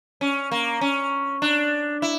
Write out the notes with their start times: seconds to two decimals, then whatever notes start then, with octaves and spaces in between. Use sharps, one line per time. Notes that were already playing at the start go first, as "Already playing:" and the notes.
0.21 C#4
0.52 A#3
0.81 C#4
1.42 D4
2.02 E4